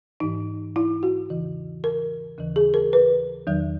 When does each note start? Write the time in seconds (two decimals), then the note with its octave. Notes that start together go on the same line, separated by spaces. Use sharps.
0.20 G#2 E3 D#4
0.76 E4
1.03 F#4
1.29 E2 C#3 E3
1.84 A#4
2.38 D#2 C#3 E3
2.56 G#4
2.74 A#4
2.93 B4
3.47 E2 D#3 F#3